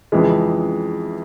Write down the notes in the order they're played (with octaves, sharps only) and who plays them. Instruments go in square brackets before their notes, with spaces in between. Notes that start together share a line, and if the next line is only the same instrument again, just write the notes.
[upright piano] F2 C#3 E3 G#3